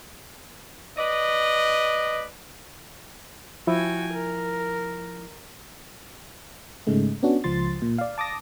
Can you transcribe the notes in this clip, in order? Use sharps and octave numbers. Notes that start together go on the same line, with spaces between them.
B4 D5 D#5
F3 E4 F#4 G5 G#5
A#4
G#2 C#3 G#3 A3
B3 C#4 D4 F#4
C#2 F3 C6 A6
A#2
D5 F5
A5 D6 D#6 A#6